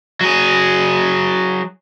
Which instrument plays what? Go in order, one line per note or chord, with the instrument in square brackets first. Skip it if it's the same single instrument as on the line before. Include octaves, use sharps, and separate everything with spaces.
[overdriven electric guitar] F#3 G#4